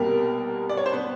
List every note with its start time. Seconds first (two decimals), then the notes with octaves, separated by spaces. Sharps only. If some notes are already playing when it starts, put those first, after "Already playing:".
Already playing: C2 B2 G3 A#3 A#4
0.69 D5
0.77 C#5
0.86 C5
0.92 B3 B4